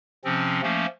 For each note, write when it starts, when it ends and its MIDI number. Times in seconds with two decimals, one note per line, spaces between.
0.25 0.61 48
0.25 0.61 53
0.25 0.61 60
0.25 0.61 61
0.63 0.86 53
0.63 0.86 57
0.63 0.86 58
0.63 0.86 61